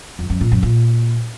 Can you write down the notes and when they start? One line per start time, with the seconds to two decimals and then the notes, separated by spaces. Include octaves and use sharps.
0.19 F2
0.30 F#2
0.41 A#2
0.52 F#2
0.63 A#2